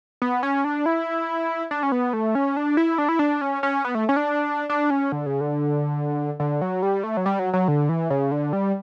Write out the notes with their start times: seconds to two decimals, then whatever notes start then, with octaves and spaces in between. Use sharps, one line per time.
0.22 B3
0.43 C#4
0.64 D4
0.86 E4
1.71 D4
1.83 C#4
1.92 B3
2.13 A3
2.35 C#4
2.57 D4
2.77 E4
2.98 D4
3.09 E4
3.19 D4
3.41 C#4
3.63 C#4
3.85 B3
3.95 A3
4.09 C#4
4.16 D4
4.70 D4
4.90 C#4
5.12 D3
5.26 C#3
5.41 D3
6.40 D3
6.61 F#3
6.83 G3
7.04 A3
7.17 F#3
7.26 G3
7.39 F#3
7.53 F#3
7.68 D3
7.89 E3
8.10 C#3
8.31 D3
8.53 G3